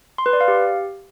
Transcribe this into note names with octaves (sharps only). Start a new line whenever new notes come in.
C6
B4
D5
F5
G4